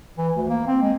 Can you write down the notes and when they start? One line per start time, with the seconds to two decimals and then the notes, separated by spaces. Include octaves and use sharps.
0.18 E3
0.36 D2
0.50 A#3
0.67 C4
0.82 G#3